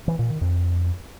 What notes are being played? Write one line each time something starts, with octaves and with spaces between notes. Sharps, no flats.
E3
A#2
D#3
F2